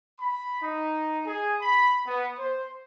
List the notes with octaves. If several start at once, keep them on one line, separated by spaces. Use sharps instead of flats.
B5
D#4
G#4
B5
B3
C5